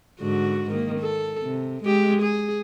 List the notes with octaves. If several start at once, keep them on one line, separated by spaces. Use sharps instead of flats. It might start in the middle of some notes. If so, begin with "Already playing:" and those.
G#2 D3 F#4
D#3 A#3
A4
C3
G#3 G4
G#4